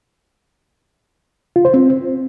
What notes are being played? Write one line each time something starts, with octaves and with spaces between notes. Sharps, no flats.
F4
C5
C4